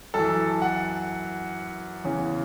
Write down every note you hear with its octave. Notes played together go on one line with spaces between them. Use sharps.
F#2 E3 A4
F#5
E2 C#3 E3